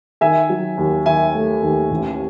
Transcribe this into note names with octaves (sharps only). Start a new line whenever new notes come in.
D#3 E5 G#5
F#3
D#2
D#3 E5 G#5
A3
D#2
A1